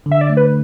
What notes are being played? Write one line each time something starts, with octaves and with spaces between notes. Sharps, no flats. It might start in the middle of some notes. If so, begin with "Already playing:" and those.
D3
E5
D5
A3
B4